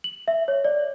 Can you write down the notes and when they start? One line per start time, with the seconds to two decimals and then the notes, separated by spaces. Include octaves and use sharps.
0.04 F#7
0.28 E5
0.48 C#5
0.64 D5